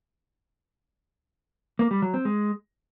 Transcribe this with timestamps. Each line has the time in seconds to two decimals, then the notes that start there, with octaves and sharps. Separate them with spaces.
1.79 A#3
1.91 G3
2.02 F#3
2.14 C4
2.25 G#3